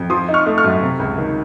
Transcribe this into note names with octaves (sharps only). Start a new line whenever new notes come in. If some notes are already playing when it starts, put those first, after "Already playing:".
Already playing: F2
F3 C6 D#6
D#4
C#6 F6
A3
C#6 F6
F#2
C3
C#2
D#3